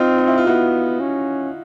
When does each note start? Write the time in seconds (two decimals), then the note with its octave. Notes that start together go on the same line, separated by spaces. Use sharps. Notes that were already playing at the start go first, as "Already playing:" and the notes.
Already playing: C4 D#4 F4
0.18 D#4
0.27 E4
0.38 F4
0.47 B3 E4 F#4
1.00 C#4